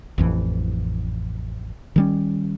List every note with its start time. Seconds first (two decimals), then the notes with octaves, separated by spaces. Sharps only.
0.18 A1 F2 E3
1.96 D#3 G3 C#4